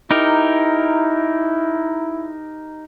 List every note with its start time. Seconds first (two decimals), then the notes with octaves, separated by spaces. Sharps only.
0.11 D#4 E4 G4 A#4